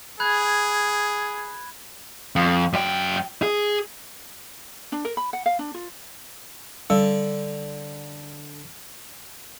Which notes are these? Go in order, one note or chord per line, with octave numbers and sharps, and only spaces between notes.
G#4 B5 F#6 G#6
F2
F#2 G5
G#4
D4
A#4
B5
F#5
F5
D4
F4
D3 G3